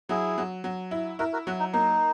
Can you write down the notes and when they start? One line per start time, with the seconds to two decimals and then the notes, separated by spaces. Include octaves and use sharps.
0.09 F#3 E4 G#4
0.38 F#3
0.64 F#3
0.91 E4
1.19 E4 F#4 A#4
1.33 F#4 A#4
1.47 F#3 F#4
1.59 D#4
1.73 A#3 D#4